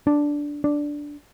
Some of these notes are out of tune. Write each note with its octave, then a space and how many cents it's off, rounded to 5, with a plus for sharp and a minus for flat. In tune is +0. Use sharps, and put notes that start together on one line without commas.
D4 -5
D4 -5